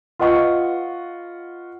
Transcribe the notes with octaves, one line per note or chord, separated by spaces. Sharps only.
F4 B4 D#5 F#5 C#6